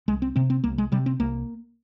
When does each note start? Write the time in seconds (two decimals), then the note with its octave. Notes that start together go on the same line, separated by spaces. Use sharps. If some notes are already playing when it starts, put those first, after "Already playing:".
0.08 C2 G#3
0.22 C4
0.36 C3 C4
0.50 C4
0.64 C2 A#3
0.78 G#3
0.92 C3 G3
1.06 C4
1.20 C2 A#3